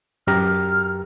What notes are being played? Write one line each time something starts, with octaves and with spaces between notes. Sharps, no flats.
F#2 G4 A#5 F6